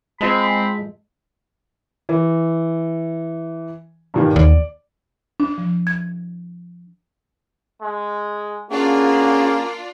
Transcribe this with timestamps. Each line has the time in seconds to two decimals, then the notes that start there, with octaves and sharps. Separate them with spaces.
0.21 G#3 C4 F4 D#5 A5 B5
2.09 E3
4.14 G2 A#2 D#3
4.36 D#2 D5
5.40 D4
5.58 F3
5.87 G#6
7.82 G#3
8.71 A#3 C#4 D4 F4 F#4 G#4 D5